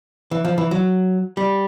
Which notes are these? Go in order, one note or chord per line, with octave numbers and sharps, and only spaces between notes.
E3
F3
E3
F#3
G3